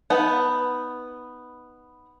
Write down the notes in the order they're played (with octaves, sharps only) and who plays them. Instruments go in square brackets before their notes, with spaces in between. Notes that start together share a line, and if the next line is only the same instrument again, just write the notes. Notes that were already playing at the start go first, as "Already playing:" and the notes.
[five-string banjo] B3 D#4 B4 F#5 A5